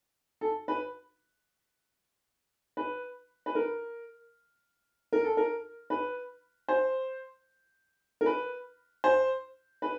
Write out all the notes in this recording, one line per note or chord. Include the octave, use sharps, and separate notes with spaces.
A4
B4
B4
B4
A#4
A#4
A4
A#4
B4
C5
A#4
B4
C5
B4